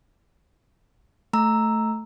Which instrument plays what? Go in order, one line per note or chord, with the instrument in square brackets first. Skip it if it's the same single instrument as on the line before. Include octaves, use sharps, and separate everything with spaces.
[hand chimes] A3 A#5 E6